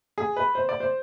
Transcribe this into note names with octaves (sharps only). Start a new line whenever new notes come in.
G#4
B4
C5
D5
C5